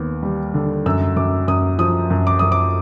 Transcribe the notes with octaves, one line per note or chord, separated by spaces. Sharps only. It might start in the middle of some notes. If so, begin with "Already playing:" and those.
Already playing: D#2 B3
G3
D3
F#2 E6
F#2 D6
F#2 D#6
F3 D#6
F#2
D6
F#2 D#6
D6